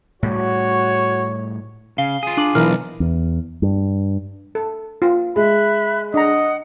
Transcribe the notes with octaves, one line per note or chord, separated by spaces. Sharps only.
A2 G3 F#4 C#5
C#3 F5 C7 G7
F4 G#4
D4 D6 F#7
B1 E3 E4 A#4 F6
E2
G2
A4
F4
G#3 E5 B5 F#6
D4 D#5 F#5 A#5